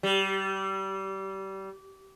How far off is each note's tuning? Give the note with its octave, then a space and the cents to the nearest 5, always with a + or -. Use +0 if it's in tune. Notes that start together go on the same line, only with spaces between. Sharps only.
G3 -25